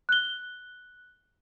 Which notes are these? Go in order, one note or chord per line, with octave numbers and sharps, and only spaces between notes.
F#6 G7